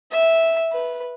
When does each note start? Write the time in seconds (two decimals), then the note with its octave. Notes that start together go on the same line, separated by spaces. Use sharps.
0.11 E5
0.72 B4